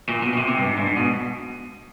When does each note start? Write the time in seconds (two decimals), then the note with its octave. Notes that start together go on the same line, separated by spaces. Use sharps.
0.09 A#2
0.22 B2
0.33 B2
0.37 C3
0.48 C3
0.57 G2
0.66 G#2
0.77 G2
0.87 G#2
0.97 B2